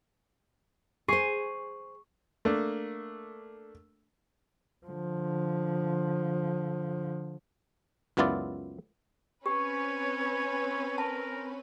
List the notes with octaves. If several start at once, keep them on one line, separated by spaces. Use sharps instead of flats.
G#4 C5 C#6 C7 D#7
A3 A#3 D4
D3 F3
C#2 F#2 B3 E4 F4 D5
C4 C#4 G4 B4 C#5
A#4 A5